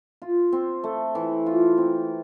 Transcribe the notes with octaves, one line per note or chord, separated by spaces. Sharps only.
F4
C4
A3
E3
F4
C4